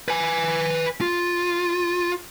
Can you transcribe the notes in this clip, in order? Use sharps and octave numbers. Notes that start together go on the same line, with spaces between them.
B4 G#5
F4